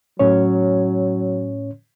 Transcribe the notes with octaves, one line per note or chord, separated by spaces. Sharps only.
A2 F#3 C#4 C#5